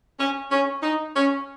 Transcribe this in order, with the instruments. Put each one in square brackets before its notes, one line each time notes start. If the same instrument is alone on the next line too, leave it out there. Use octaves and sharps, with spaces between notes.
[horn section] C#4
C#4
D#4
C#4